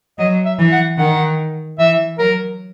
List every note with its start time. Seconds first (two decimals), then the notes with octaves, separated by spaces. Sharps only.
0.19 F#3 D#5
0.45 E5
0.59 E3
0.72 F#5
0.98 D#3 F#5
1.79 E3 E5
2.19 F#3 A#4